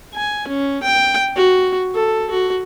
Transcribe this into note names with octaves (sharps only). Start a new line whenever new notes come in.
G#5
C#4
G5
F#4
A4
F#4